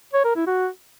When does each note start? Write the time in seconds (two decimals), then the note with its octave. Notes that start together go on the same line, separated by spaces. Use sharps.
0.14 C#5
0.25 A#4
0.36 E4
0.47 F#4